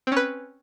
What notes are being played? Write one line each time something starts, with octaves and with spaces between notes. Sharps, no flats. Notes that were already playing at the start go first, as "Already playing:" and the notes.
C4 C#4 B4